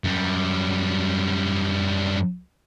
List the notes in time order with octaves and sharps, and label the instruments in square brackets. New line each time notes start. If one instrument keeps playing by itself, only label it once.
[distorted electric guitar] F#2 G3